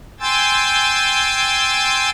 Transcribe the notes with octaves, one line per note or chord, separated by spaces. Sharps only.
G5 G#5 C6 E6 G6 A6